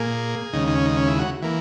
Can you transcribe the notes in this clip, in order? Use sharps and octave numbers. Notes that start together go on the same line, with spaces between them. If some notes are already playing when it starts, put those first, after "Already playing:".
Already playing: A#2 A#3 G#4
D#2 C#3 G#3 D#4
D#4
C#4
D#4
C#4
E4
F#4
E3 A#3